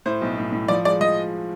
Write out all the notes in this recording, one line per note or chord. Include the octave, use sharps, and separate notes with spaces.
A2 C5
B1
A2
A2
F3 D5
G#3 D5
F3 D#5